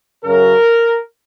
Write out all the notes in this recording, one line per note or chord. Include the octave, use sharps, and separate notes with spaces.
F#2 C#3 F#3 A#4